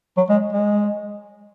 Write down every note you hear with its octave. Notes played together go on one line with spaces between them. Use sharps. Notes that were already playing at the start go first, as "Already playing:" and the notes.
F#3
G#3
G#3